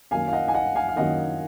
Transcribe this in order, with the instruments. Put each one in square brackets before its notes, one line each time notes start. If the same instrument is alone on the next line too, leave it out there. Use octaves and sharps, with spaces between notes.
[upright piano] F#2 D#3 A#3 [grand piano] F5 G#5
[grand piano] F5
D#5 F#5
G#5
D#5 F#5
F5 G#5
F5
[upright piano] F#2 D#3 A#3 [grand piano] D#5 F#5